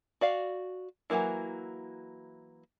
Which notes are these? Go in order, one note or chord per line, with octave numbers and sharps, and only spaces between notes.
F#4 D5 F5
E3 F#3 G3 A#3 E4